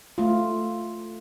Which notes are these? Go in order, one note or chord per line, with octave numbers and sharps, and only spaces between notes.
A3 F4